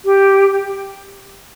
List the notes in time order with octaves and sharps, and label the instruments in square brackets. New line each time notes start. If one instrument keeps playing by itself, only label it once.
[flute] G4